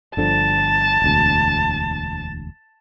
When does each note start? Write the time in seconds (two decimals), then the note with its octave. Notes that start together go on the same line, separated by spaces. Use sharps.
0.17 G1 D3 F3 A5
1.02 E1 D2